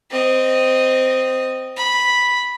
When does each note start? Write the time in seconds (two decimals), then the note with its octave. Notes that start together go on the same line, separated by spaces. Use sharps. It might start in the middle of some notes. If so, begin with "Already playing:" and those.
0.11 C4 D#5
1.77 B5